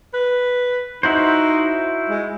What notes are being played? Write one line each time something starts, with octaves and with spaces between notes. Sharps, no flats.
B4
D#4 E4 F#4 C5
G#3